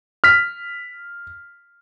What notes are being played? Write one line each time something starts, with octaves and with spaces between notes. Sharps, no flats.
F6 B6